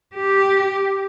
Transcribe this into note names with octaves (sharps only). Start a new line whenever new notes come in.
G4